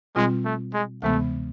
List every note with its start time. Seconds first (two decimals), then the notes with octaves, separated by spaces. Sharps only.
0.16 B2 G3 G#3 C4 F4
0.45 A3
0.74 G#3
1.02 D2 C3 E3 G#3 A3 B3